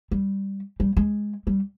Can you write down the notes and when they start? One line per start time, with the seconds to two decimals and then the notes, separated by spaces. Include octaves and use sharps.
0.11 G3
0.80 G3
0.97 G#3
1.47 G3